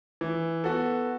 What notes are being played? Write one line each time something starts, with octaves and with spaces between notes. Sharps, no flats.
E3
B3 F#4 A4